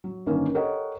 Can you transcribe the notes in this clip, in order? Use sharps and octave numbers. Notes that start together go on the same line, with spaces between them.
F#3
G1 D#3 A#3 C#4
G4 A4 A#4 C#5 D#5 F#5